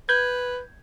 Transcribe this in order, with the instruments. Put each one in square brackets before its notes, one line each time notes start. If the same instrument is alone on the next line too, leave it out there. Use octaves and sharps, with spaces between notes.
[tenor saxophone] B4 [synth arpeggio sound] G6 G#6